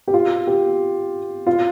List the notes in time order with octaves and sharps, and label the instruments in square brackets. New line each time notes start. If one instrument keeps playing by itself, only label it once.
[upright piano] G4
F4
G4
F4